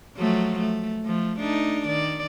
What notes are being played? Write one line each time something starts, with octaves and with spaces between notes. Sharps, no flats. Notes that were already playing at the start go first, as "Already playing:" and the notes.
F3 F#3 A3
A3
F3 A3
A3 D4 D#4
D#3 D5